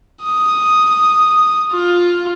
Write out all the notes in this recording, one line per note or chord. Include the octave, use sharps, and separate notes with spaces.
D#6
F4